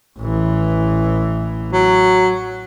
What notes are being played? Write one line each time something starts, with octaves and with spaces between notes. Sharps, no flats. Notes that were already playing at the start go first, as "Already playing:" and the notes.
A1 E3
F#3